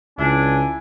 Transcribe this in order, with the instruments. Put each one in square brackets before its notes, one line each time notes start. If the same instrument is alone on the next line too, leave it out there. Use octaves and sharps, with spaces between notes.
[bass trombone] C#2 [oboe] D4 [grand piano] E4 [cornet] G#5